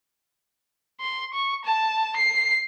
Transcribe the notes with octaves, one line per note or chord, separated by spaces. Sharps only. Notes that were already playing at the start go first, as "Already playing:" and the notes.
C6
C#6
A5
C7